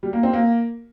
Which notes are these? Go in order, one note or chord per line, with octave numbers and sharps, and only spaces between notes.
G3
A#3
C4
A#3